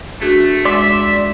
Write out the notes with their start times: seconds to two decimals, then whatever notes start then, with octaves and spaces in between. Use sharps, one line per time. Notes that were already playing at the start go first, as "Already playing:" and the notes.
0.21 A3 D4 F#4 G#4
0.65 D2 G#3 D5 E5 C6 D6